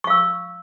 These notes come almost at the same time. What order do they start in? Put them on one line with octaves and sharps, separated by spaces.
C#6 F5 E6